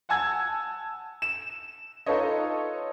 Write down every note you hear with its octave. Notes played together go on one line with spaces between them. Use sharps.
F#5 G#5 A5 E6 G#6
E7
D#4 F4 A4 B4 C#5 D#5